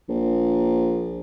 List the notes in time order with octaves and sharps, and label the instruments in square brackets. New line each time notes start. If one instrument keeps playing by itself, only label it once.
[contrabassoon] A#1